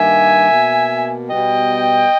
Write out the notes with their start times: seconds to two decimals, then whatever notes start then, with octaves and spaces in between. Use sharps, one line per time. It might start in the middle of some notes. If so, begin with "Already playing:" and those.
Already playing: G2 D#3 A#3 E5 G#5
0.50 B2 A#3
1.29 B2 G3 B3 D#5 G5